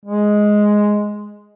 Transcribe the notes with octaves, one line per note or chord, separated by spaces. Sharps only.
G#3